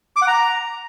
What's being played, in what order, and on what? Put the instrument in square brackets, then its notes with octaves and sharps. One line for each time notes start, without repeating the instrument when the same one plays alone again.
[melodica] D6
F#5
A#5